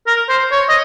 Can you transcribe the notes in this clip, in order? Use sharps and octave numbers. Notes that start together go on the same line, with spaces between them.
A#4
C5
C#5
D#5